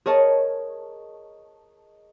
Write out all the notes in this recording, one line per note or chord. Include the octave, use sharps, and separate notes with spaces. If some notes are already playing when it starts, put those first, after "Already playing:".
G#4 A#4 C#5 D#5 A5